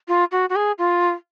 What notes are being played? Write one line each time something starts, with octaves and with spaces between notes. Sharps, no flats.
F4
F#4
F#4
G#4
F4